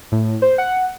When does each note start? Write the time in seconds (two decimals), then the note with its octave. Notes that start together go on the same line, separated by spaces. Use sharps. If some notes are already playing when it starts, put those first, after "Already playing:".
0.12 A2
0.42 C5
0.58 F#5